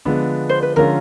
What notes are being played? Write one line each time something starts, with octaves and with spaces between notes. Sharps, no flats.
D3 F3 G#3 B3 D4
C5
B4
D3 F3 G#3 C#4 F4 A#4